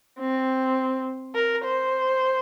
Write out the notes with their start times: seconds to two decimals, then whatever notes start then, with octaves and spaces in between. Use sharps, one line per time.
0.19 C4
1.35 A#4
1.64 C5